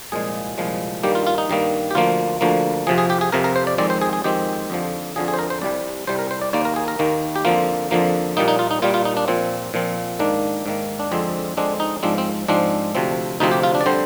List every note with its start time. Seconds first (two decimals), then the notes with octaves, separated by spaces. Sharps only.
0.12 C2 A#2 F3 G#3 G#4
0.58 C2 A#2 F3 G#3
1.03 G2 D#3 G3 A#3 G4
1.15 F4
1.27 F4
1.38 D#4
1.50 G2 D#3 G3 A#3
1.91 G4
1.95 D2 D3 F3 A#3 F4
2.41 D2 D3 F3 A#3
2.87 F2 C3 F3 G#4
2.98 G#4
3.10 G4
3.21 G#4
3.32 F2 C3 F3 A#4
3.44 A#4
3.56 C5
3.67 D5
3.78 F2 D#3 G#3 C4 D5
3.90 C5
4.01 G#4
4.13 G#4
4.24 F2 D#3 G#3 C4 G4
4.70 F2 D3 F3
5.16 F2 D3 F3 G#4
5.28 G#4
5.34 C5
5.39 A#4
5.50 C5
5.62 C2 C3 G3 D5
6.07 C2 C3 G3 C5
6.19 A#4
6.31 C5
6.41 D5
6.53 D#2 D#3 A#3 D5
6.65 A#4
6.76 G#4
6.88 A#4
6.99 D#2 D#3 A#3
7.36 G4
7.45 F2 D3 F3 A#3 F4
7.91 F2 D3 F3 A#3
8.37 A#2 G3 A#3 D#4
8.48 D#4
8.59 F4
8.71 D#4
8.82 A#2 G3 A#3 F4
8.94 F4
9.05 D#4
9.17 D4
9.28 A#2 F3 C4
9.74 A#2 F3 C4
10.19 G#2 D#3 A#3 D4
10.66 G#2 D#3 A#3
11.00 D4
11.12 F2 D3 G#3 C4
11.57 F2 D3 G#3 C4 D4
11.80 D#4
12.03 G#2 F3 G#3 C4 D4
12.18 C4
12.48 G#2 F3 G#3 C4 D4
12.95 D2 C3 F3 C4
13.40 D2 C3 F3 C4 D#4
13.52 G4
13.63 F4
13.75 D4
13.81 D5
13.86 D3 G3 C4 C5